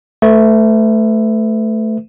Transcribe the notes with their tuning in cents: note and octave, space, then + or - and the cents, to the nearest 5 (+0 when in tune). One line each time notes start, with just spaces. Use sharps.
A3 +0 B4 +30 E5 +0